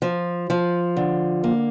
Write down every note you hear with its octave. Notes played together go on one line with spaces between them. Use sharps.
F3
F3
D3
A#3